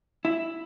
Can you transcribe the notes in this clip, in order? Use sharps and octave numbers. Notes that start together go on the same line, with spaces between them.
E4